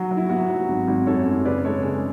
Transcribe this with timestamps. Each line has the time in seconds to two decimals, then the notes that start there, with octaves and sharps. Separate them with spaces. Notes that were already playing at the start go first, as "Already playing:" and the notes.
Already playing: F#3 F#4
0.11 F#3
0.17 E4
0.29 B3 F#4
0.49 F#3
0.68 G#1
0.88 G#1
1.06 F#2 A4 C#5
1.26 F#2
1.45 C#3 B4 D5
1.65 G#3 A4 C#5
1.84 C#3